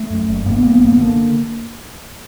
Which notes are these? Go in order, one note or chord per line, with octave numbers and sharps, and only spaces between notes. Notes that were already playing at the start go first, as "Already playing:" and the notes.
Already playing: A3
F#2
F#1
G2 A#3
B3
G1 A#3
B3
G1 A#3
B3
D3 A#3